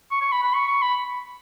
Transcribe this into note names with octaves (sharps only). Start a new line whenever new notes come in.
C#6
C#6
B5
B5
C#6
C#6
B5